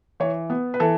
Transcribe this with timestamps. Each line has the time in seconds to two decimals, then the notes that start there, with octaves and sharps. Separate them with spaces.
0.20 E3 C#5
0.50 B3
0.74 B4
0.80 E3 A4